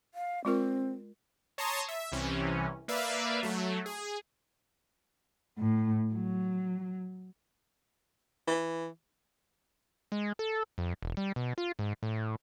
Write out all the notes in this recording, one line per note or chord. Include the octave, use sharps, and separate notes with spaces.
F5
G#3 C4 F4 A#4
C#5 A5 A#5 C6 C#6 D#6
E5
C2 C3 E3 C#4
A#3 B4 D5 E5 F5
F#3 A3
G#4
A2
F#3
E3
G#3
A4
F2
E1
G3
B2
F4
G#2
A2